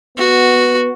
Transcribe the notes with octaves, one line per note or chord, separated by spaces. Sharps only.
B3 F#4